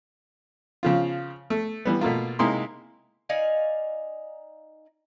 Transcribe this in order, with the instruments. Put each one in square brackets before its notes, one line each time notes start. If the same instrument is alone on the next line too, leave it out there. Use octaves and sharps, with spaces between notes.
[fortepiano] C#3 F3 F4
A3
E3 G3 B3
B2 A3 A#3 F4
C3 G#3 A#3 D#4 E4 C6
[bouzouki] D#4 D5 F5 G#5